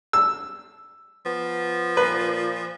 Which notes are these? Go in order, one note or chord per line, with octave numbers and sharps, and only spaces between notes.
E6
F3 B3
A#2 B4